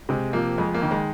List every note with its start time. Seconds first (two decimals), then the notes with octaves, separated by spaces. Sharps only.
0.09 C3 G#3
0.33 F3 A#3
0.58 F2 G#3
0.75 A#3
0.82 D#3
0.91 G#3